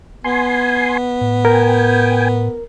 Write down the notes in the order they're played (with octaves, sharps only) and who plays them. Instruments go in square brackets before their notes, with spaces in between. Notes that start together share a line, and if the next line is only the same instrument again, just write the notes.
[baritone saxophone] B3 [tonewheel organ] G#5 C6
[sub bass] A2
[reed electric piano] A#4 [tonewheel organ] G5 G#5